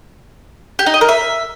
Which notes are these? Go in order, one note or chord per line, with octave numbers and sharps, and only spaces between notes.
G4
D#4
D#5
A#4
E5